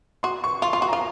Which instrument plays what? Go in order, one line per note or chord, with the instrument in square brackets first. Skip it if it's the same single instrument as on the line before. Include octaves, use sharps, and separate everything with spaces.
[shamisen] F#4 [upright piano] C6
[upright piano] C#6
[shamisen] F4 [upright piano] C6
[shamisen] F4
[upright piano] C6
[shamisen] F#4
[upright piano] A#5
[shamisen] F4